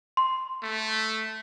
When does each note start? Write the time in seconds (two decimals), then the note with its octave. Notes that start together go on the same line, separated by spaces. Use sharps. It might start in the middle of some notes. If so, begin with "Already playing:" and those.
0.17 C6
0.63 A3